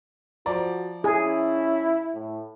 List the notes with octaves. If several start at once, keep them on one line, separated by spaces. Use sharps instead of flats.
F3 F#4 D5 A#5
C#4 E4 G#4
A2